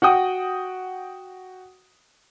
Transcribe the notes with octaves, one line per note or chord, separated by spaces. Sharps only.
F#4 F#5 G5 D#6